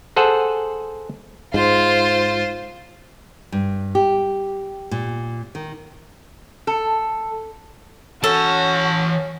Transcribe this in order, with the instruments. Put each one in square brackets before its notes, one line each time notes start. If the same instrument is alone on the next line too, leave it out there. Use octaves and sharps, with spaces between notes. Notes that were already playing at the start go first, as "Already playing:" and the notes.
[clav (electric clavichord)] G#4 A4 C5 F#5
[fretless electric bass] G#2 [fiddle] F4 [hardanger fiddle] C5
[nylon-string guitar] G2
G4
A#2
D#3
[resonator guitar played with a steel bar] A4
[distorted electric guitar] E3 A5 [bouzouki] C#4 [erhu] F#4 [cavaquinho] A4